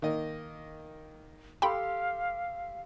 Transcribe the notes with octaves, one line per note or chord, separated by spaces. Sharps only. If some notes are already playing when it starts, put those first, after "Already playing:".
D#3 A#3 D#5
G4 A4 F5 G5 B5 C6